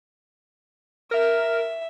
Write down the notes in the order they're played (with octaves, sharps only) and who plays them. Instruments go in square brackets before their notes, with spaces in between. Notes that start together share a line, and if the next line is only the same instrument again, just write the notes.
[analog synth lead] A#4 [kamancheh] E5